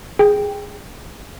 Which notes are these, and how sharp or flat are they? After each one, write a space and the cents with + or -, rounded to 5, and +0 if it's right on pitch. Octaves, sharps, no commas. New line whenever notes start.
G#4 -10 G5 +5